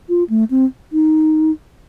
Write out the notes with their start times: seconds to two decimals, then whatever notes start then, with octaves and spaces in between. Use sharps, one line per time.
0.09 F4
0.30 A3
0.51 C4
0.93 D#4